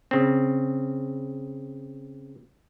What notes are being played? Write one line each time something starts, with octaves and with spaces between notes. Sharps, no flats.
C#3 C4